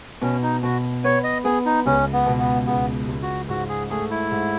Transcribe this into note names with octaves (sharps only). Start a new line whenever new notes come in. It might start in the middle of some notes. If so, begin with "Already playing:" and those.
B2 C#4
D#4
B2 F#4
B3 C#5
D#5
B3 G#4
D#4
C#2 C#4
B3
B2
B3
C#2 B3
C#2
F#4
G#2 F#4
G#4
A3 G#4
E4
G#2